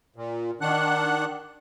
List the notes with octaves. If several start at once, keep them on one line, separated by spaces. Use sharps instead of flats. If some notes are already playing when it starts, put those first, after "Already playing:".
A#2
D#3 D4 F#5 F#6